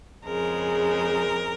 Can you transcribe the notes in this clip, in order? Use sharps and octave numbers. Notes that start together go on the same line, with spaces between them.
F2 C#3 G#3 A#4